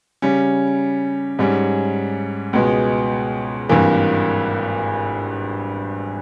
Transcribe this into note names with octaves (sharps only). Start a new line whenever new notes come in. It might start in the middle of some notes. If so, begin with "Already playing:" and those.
C#3 G3 C#4
G#2 G3 C#4
C#2 B2 G#3 B3
G#1 G2 E3 A#3